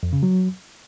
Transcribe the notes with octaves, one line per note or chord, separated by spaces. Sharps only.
F2
C#3
F#3